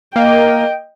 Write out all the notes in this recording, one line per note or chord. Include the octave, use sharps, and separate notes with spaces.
A#3 D#5 G5